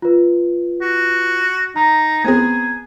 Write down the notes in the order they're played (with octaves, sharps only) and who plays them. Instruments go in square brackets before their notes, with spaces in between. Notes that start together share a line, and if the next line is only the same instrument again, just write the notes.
[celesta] F4 B4
[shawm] F#4
[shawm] D#4 [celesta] A#5
[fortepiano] B3 C4 G#4 [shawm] G#5